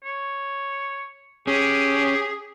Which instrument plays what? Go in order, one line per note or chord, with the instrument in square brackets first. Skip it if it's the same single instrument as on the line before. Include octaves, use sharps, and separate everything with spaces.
[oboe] C#5
[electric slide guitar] C#4 [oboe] G4 [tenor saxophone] G#4